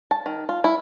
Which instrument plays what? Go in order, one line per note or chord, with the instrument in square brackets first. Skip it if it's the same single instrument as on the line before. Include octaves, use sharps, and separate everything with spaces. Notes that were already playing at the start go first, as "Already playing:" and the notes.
[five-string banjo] A5
D#3
F4
E4